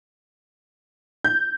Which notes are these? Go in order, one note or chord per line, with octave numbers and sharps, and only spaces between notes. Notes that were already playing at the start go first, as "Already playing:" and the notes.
G6